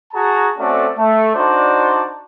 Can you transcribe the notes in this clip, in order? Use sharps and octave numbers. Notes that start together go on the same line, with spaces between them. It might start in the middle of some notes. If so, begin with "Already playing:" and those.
F#4 G#4 A5 A#5
A3 C4 C#4 F#4 A4 D5
A3
D4 D#4 F#4 C5 D5 A5